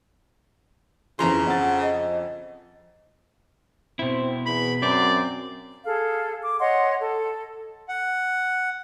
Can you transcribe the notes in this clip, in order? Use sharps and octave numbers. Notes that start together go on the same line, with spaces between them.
F2 C#3 E3 F3 E5 A#5 C6
F2 F#5 A6
D#5
B2 C4 E4
E2 B5
F#2 C4 D5
G#4 A4 F5
D6
C#5 D#5 F#5 C6
A4
F#5